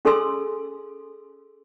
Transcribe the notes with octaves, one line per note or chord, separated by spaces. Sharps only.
C#4 G#4 A4 G#5 C6 E6